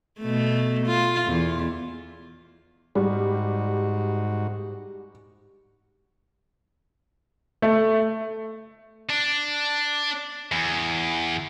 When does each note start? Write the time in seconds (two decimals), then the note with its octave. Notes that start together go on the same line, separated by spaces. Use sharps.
0.21 B2 A3
0.87 F4
1.26 E2
2.95 G#2 G3 F#4
7.62 A3
9.09 D4
10.52 E2